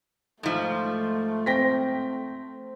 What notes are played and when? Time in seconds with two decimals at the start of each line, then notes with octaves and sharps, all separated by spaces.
0.43 G#2 F3 A3
1.46 C4 G5 A#6 B6